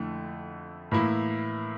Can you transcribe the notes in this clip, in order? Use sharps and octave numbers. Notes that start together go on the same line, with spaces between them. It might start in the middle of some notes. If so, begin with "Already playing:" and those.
Already playing: F2 D3 A3 E4
A2 E3 A#3 E4